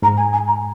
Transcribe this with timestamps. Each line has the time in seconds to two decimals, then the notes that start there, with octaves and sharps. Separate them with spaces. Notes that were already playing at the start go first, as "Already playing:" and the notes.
0.02 G#2 A#5
0.17 G#5
0.33 G#5
0.47 A#5